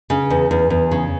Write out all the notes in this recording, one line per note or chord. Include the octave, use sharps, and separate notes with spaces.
C#3
E2
E2
E2
C#3